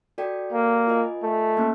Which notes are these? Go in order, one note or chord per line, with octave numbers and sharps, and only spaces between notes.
F#4 A4 D5 G5
A#3
F4 A#4 D#5 G#5
A3
A#3 C#4